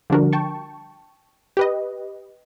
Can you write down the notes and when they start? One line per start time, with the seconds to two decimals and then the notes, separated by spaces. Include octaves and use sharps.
0.10 D3 F3 G3 D4 F#4 A#4
0.33 G5 A5 C#6
1.57 G4 B4 D#5